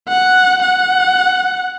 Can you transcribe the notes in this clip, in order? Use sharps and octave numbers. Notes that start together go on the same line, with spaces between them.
F#5
F#5